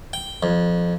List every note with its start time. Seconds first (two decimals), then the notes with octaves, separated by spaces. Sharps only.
0.13 G5
0.43 F2